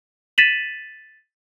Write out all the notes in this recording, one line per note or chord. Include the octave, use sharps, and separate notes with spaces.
A6 B6 D#7 E7 F#7